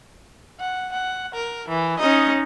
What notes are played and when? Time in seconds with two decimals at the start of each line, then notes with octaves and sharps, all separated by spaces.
0.60 F#5
0.92 F#5
1.34 A#4
1.68 E3
1.99 C#4 D#4 D#5